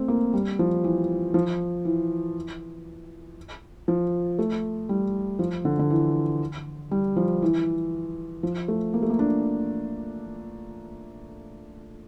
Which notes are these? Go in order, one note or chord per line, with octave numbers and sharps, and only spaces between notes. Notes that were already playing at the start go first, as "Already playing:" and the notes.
Already playing: A3 C4
A#3
G3
F3
E3
F3
E3
F3
A3
G3
F3
D3
D3
E3
G3
F3
E3
F3
A3
A#3
A3
A#3
D4